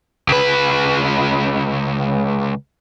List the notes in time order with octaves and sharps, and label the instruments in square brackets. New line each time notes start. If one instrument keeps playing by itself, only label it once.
[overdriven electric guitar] C#2 B4